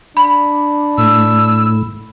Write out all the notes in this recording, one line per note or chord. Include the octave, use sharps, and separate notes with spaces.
D4 B5
A2 E6